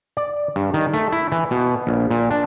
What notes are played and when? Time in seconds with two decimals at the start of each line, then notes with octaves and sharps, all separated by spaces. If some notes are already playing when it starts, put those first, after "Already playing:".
0.17 D5
0.56 G2
0.74 D#3
0.94 A3
1.12 E4
1.32 E3
1.51 B2
1.87 A#1
2.10 A#2
2.31 D4